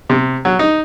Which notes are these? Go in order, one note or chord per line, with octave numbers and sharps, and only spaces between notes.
C3
F#3
D#4